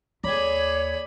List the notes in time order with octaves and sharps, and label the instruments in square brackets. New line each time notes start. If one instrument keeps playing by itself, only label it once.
[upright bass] D#2 [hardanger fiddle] G#4 B5 [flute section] C#5 [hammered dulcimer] D5